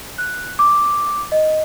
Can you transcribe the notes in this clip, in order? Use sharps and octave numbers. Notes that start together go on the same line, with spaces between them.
F#6
D6
D#5